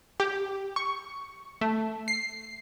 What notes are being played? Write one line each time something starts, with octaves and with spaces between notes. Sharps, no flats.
G4
C#6
A3
C7